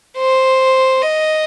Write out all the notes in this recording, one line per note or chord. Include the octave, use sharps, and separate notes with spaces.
C5
D#5